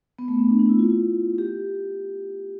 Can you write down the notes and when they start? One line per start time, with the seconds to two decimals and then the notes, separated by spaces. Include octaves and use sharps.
0.19 B3
0.28 A3
0.39 C4
0.49 D4
0.59 D4
0.69 E4
0.79 F4
1.38 G4